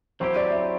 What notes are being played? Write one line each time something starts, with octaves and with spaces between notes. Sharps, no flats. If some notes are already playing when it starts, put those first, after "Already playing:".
F#3 C4 E4 G4 C5
D5
E5